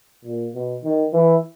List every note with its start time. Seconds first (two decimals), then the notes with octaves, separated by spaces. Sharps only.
0.25 A#2
0.54 B2
0.84 D#3
1.13 E3